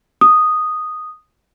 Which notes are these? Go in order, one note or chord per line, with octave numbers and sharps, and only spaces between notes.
D#6